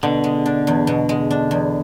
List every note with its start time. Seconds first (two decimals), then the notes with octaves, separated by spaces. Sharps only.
0.03 B2 D3
0.24 G#3
0.46 D4
0.67 E2
0.87 B2
1.09 G#3
1.31 D4
1.51 E2